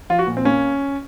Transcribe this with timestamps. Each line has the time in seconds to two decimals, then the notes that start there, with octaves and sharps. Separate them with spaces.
0.10 F3 F4
0.19 F#4
0.27 A#2
0.37 C4
0.45 A#3 C#4